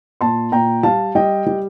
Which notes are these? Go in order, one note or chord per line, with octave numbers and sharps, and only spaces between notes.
A#2 A5 C6
A#2 G5 A#5
G3 F5 A5
G3 D#5 G5
G3